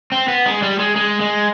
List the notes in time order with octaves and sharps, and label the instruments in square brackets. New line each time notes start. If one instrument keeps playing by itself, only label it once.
[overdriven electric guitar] C4
B3
G#3
G3
G#3
G#3
G#3